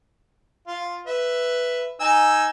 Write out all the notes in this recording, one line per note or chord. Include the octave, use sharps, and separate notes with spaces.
F4 F5
B4 E5
D#4 G#5 E6